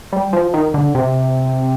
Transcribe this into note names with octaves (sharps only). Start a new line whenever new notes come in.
G3
F3
D#3
D3
C3